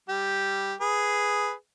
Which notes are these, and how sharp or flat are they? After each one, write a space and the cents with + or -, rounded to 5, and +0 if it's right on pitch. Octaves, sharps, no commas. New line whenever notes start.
G3 +0 G4 +0
G#4 +0 B4 +0